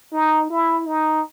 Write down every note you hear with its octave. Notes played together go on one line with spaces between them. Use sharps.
D#4
E4
D#4